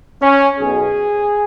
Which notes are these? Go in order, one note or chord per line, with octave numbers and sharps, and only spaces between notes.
C#4
B1 B2 G#4